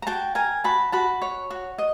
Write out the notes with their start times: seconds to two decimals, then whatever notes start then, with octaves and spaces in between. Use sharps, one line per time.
0.02 A#5
0.07 F#4 G5 A5
0.35 A#4 G#5 A#5
0.64 F#4 A5 B5
0.92 F#4 A5 B5
1.22 C#5
1.51 F#4
1.78 D#5